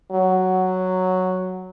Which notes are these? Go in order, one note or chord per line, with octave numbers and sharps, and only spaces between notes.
F#3